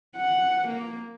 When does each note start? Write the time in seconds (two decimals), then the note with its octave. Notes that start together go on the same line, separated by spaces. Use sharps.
0.17 F#5
0.68 A#3